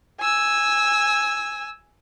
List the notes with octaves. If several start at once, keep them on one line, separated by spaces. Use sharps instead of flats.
G#5 E6